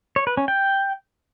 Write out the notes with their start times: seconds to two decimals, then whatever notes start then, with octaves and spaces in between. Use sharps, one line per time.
0.16 C#5
0.27 B4
0.37 C#4
0.48 G5